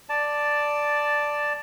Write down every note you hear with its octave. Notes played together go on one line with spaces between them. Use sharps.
D5 A5